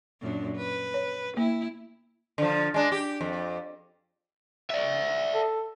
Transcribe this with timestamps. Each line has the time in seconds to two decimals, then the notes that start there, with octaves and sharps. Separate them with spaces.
0.22 F#2 A#2 D4
0.57 B4
0.94 C#5
1.37 A#3 E4
2.38 D3 F3
2.74 G#3 D4
2.92 G4
3.21 F2
4.70 D5 E5
5.34 A4